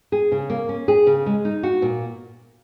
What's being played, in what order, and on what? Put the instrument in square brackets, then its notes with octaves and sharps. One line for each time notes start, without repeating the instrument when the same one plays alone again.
[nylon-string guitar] G#4
C#3
A#3
C#4
G#4
C#3
G#3
D#4
F#4
A#2